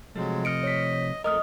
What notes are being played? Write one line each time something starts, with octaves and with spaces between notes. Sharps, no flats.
C3 F3 F#3 G#3 A3
D#5 F6 C#7 D7
C#5 B6
F2 A3 A#4 D#5 D#6 F6